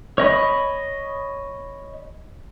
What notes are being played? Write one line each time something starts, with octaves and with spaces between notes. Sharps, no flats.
C#5 D#5 B5